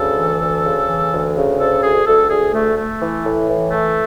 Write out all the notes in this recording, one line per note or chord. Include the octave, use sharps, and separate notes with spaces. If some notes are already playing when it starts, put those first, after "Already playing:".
Already playing: D2 C#3 A4
E3
D2
C#3
E3
D2
C#3
D2 A4
D2 G#4
D2 A4
D2 G#4
A3
A3
E3
A2
E3
A3